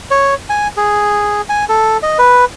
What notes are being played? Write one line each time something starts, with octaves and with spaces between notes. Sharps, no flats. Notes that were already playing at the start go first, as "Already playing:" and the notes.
C#5
G#5
G#4
G#5
A4
D#5
B4